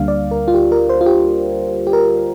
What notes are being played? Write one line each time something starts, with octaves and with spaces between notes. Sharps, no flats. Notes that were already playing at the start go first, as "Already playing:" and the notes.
Already playing: D2 D3 G3 A#3 D4 F5
D5
A#4
F4
G4
A#4
C5
F4
G4
G4
A#4